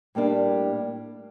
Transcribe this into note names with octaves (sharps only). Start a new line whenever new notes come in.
A2 G3 A#3 D4